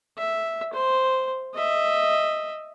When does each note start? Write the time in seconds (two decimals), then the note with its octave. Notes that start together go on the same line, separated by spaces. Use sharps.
0.18 E5
0.73 C5
1.55 D#5 E5